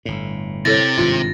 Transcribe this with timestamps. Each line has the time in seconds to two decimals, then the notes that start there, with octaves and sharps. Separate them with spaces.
0.05 G1 A2
0.65 C3 E4 A4 C#5 A6 A#6
0.97 G#1 G2 F4